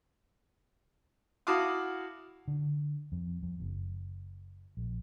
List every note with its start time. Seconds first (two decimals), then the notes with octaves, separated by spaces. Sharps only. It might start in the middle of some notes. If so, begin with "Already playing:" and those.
1.47 E4 F#4 F5 A5 D6 D#6
2.48 D3
3.12 F2
3.43 F2
3.60 F#1
4.77 A#1